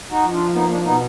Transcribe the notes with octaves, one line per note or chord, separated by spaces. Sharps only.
D#4 F#4
F3
D4 F4
A#3 B3 D#4
A#3 D4
B2 B3 D#4